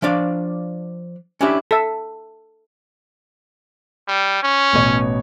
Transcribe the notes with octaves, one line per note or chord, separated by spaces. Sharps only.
F3 D4 D5 F5
C#4 D4 E4 G4 E5
A4 E5
G3
C#4
A1 B2 C#5